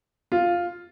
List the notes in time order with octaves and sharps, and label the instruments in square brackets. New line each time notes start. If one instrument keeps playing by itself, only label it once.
[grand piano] F4